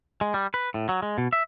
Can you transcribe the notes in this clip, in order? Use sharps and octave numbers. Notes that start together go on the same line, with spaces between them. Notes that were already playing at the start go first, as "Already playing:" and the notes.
G#3
G3
B4
A2
F#3
G#3
B2
E5